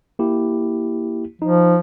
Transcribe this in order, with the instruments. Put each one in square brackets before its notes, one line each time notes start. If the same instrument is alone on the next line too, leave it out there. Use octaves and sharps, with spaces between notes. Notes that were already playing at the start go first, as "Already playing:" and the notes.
[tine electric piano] A#3 E4 G4
[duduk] F3 [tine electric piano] D#4